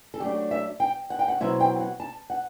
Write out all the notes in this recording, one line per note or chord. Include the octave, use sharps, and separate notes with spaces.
A4
F#3 A3 D4 G4
E5
G5
F#5
G5
F#5
B2 F#3 C4 E4 E5
G5
F#5
A5
F#5